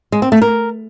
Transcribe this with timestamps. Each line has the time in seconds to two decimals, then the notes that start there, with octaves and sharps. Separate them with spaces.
0.12 G#3
0.22 C4
0.32 A3
0.42 A#4